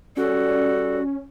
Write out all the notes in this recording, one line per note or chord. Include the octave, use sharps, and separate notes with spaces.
G3 C#4 F#4 A4 D5